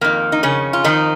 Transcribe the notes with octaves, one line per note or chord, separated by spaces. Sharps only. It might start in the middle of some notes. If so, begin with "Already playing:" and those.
F2 D#3 A#3
D#4
C#3 C#4
F4
F2 D#3 F3 D#4